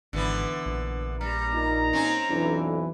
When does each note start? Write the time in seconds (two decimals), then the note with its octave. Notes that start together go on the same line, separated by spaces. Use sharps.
0.13 G#1 D3 E3 B3
0.66 A#1
1.21 G3 A#5
1.53 A#2 D#4
1.93 C4 C#4
2.30 B1 F2 E3 D4